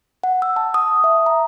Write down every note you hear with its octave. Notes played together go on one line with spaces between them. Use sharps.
F#5
E6
A5
D#6
E5
A#5